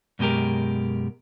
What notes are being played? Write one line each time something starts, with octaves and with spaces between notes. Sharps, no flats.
F#2 B2 G#3 G4 A#4